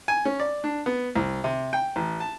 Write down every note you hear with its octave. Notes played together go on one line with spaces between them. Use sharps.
G#5
C#4
D5
D4
B3
C2
C3
G5
A1
A5